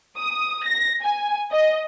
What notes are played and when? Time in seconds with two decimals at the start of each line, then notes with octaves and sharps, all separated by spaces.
0.17 D#6
0.65 A#6
1.02 G#5
1.52 D#5